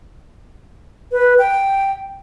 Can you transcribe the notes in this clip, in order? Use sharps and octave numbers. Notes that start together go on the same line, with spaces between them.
B4
G5